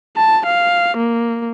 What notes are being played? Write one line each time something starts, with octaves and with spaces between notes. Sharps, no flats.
A5
F5
A#3